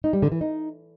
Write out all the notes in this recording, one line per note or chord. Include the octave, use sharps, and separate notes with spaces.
D#4
G3
D3
E3
D#4